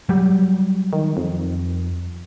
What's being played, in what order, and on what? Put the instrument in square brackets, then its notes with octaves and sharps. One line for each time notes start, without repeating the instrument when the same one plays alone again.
[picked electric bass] F#3 G3
[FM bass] D#3
F2